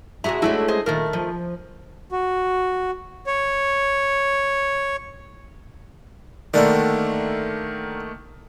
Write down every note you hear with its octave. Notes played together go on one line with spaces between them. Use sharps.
C3 E4 F#4 G#4 A#5
G#3 A3 C#4 D4 E4 F#4
G#4 C5 D#5
A#2 D#3 A3 A#4
F3
F#4
C#5
D3 D#3 A3 A#3 D4 D5